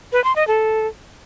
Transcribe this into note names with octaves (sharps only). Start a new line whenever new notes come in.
B4
C6
D#5
A4